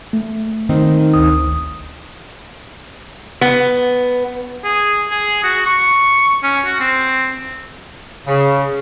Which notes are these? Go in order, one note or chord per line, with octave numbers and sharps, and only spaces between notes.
A3
D#3 C4 D#4
G1 D2 D#6
B3
G#4
G#4
F#4
C#6
C#4
F#4
C4
C#3